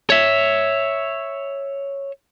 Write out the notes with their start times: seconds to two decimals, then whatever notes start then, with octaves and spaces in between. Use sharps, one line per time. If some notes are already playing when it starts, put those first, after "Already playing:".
0.10 C#5 E5